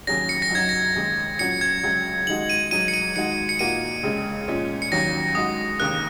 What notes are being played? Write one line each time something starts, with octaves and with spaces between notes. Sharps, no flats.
D#2 C#3 F#3 C#4 G#4 A#6
C#7
A#6
F#2 F#3 D#4 F#4 G#6
A#6
D#2 C#3 G#3
A#2 F#3 C#4 F#4 C#7
G#6
C#2 C#3 F#3
D#3 G#3 D#4 F#4 F#7
D#7
G#2 F#3 D#4 D#7
C#7
D#7
D#3 G#3 D#4 F#4 C#7
C#7
A#2 A#3 D#4 F#4 D#7
C#2 C#3 G#3
A#2 G#3 C#4
C#7
D#2 D#3 F#3 C#4 A#6
G#2 G#3 F#4 D#6
D#2 C#3 A#3 F#6